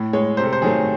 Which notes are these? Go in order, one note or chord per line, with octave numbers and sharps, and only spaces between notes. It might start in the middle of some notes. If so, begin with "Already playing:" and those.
Already playing: A2
G#3 C#5
C3 C5
A4
C5
D#3 F#3 A3 G#4